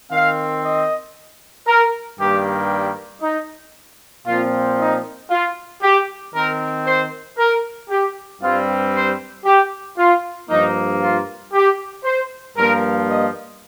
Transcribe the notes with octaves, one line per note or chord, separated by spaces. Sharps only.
D#3 C4 F5
D#5
A#4
G2 D#3 G3 A#3 G4
D#4
A#2 F3 C4 F4
D#4
F4
G4
D#3 C4 A#4
C5
A#4
G4
G2 G3 C4 F4
C5
G4
F4
G2 F3 A#3 D#4
F4
G4
C5
G2 F3 A#3 A#4
D#5